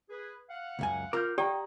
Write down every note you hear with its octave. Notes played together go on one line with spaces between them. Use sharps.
G#4 B4
F5 F#5
C#2 F#2 G#5
F4 A#4 D6 F6 G6
G4 D5 F#5 G5 A#5 D#6